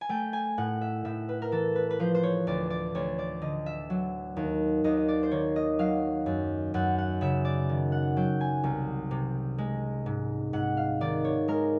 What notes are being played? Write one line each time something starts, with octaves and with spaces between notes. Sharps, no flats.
G#5
A3 G5
G#5
A2 F#5
E5
A2 E5
B4
A#4
E3 A4
B4
B4
F3 C5
C5
C#5
D2 D5
D5
D2 C#5
D5
D3 D#5
E5
F#3
D#2
D#2 D#5
D#5
D5
C5
D#3 C#5
D#5
F#3 F5
F#2
F#2 F#5
F#5
C#3 E5
D5
D#3
F#5
F#3 G5
G#5
C2
C3
G#3
G#2
G#2 F#5
F5
D#3 D5
C#5
G#3 A#4